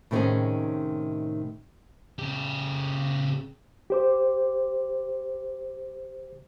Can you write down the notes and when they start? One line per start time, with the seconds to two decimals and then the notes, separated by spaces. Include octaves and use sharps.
0.11 A2 C3 D#3 C#4 D#4 G#4
2.19 C#3 G4
3.90 G4 C5 D6